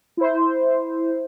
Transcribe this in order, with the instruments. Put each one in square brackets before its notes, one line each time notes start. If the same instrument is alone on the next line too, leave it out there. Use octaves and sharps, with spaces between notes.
[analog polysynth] E4 C5